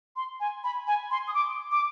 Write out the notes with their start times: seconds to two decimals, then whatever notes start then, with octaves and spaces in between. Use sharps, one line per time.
0.16 C6
0.40 G#5
0.64 B5
0.87 G#5
1.11 C6
1.28 D#6
1.34 D6
1.72 D6